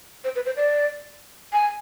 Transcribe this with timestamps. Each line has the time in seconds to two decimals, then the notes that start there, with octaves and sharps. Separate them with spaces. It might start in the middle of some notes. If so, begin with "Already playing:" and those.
0.24 C5
0.35 B4
0.46 C5
0.57 D5
1.53 G#5